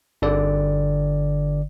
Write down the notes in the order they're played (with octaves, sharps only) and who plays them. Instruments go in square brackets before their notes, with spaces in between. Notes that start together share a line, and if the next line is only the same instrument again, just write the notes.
[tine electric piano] G1 D3 D5